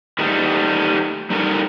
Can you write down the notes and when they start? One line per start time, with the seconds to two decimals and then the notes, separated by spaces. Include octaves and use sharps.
0.19 D#3 G3 A3 D#4
1.30 G3 D#4 A4 A#4